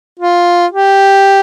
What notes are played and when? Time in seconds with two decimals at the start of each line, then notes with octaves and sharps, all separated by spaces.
0.19 F4
0.72 G4